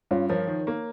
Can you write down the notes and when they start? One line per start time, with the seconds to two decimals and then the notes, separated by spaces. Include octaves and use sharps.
0.11 G2 C#4 F4
0.30 F3 A#4 C#5
0.47 D#3
0.67 A#3